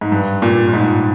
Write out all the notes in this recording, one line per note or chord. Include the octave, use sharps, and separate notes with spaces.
G#2
G2
A#2
A#2
G#2